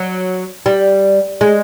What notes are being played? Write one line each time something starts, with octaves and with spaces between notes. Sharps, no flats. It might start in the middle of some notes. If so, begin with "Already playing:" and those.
Already playing: F#3
G3
G#3